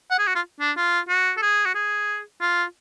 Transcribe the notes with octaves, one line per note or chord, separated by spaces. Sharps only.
F#5
G#4
F#4
F4
D4
F4
F#4
A4
G#4
F#4
G#4
F4